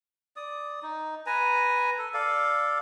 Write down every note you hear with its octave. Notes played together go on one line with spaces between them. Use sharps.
D5 D#6
D#4
B4 G#5 A#5
A4
A4 D5 F5